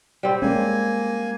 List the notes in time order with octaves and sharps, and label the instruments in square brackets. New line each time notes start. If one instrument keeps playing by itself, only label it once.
[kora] G3 C4
[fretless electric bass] G#3 C#4 [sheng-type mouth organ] A#3 G#5